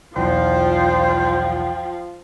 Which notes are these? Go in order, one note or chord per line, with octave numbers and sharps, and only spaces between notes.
B1 E2 F3 F4 C5 G5